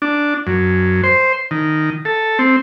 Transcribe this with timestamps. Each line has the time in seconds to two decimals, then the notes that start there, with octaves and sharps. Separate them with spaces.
0.02 D4
0.47 F#2
1.04 C5
1.51 D#3
2.05 A4
2.39 C4